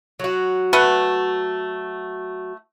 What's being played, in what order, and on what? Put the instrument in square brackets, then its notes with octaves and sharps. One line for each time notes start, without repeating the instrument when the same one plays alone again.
[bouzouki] F#3 F#4
[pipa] A3 B4 F#5